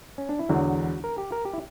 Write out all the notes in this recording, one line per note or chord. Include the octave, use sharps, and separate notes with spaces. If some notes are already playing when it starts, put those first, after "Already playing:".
C#4
D4
E4
E1 E2 D3 F#4
A#4
G4
A#4
G4
E4